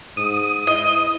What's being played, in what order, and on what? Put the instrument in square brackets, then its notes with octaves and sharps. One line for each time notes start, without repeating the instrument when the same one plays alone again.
[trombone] G#2 [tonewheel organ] D#6
[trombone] E4 [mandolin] D#5